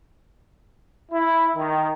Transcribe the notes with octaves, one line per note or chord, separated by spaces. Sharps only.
E4
D#3